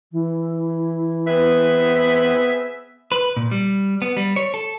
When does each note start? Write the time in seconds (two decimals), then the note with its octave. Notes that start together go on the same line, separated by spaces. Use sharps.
0.12 E3
1.27 B3 C4 G#4 B4 E5
3.12 B4
3.37 A#2
3.51 G3
4.02 B3
4.17 G3
4.36 C#5
4.54 A4